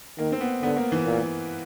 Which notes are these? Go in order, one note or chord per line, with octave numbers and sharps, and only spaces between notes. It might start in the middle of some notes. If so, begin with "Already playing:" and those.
D#3 A#3
C4
B3
D3 B3
A#3
E3
A#2